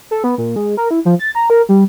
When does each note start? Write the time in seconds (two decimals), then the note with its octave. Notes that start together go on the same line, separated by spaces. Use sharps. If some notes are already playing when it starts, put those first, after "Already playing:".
0.11 A4
0.24 B3
0.38 A#2
0.56 G#3
0.77 A#4
0.91 E4
1.05 F3
1.19 A6
1.35 A#5
1.50 A#4
1.69 G3